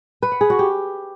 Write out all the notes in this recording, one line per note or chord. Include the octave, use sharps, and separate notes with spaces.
B4
F#5
G#4
F#4
G4